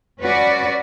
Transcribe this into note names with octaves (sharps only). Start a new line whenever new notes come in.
C#4 F#4 B4 D5